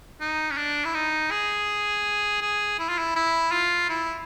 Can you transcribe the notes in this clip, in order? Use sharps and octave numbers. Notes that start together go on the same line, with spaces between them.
D#4
C#4
D4
E4
D#4
G#4
G#4
E4
F4
E4
E4
F4
E4